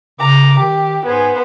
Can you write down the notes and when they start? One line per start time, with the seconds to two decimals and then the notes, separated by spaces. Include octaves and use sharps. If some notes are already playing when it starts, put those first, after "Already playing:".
0.20 C#3 A#5 D6
0.59 D#3 G4
1.06 G#2 B3 G#4 C5 G#5